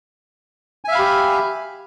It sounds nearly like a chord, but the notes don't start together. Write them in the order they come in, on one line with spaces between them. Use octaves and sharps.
G#5 E5 F5 B5 G4